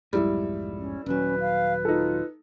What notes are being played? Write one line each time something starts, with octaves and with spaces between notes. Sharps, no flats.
B1 F2 G#2 G3 E4
C#4
D#1 F#3 C#4 B4
F5
D#4 F4 A4